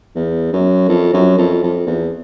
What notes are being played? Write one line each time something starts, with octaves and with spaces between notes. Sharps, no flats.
E2
F#2
F2
F#2
F2
F2
E2